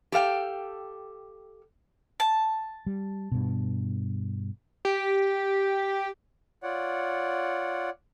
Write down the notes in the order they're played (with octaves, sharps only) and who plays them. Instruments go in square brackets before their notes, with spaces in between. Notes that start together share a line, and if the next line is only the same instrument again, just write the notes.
[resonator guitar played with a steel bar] G4 A4 F5 G5
[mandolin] A5
[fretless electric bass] G3
G2 B2
[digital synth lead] G4
[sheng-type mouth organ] F4 C#5 D5 F#5